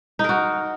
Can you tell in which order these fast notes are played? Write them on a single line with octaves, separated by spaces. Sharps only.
D#4 A#4 F#4